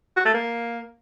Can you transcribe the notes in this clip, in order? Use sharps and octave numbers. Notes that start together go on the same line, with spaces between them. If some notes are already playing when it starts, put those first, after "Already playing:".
F#4
A3
A#3